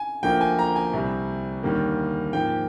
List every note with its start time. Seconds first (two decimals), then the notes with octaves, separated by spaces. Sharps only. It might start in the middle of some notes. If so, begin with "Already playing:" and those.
Already playing: G#5
0.23 D2 D3 F3 A#3 G5
0.41 G#5
0.59 A#5
0.76 G#5
0.93 C2 C3 G3
1.63 D#2 D3 G3 A#3
2.33 G#2 F3 A#3 G5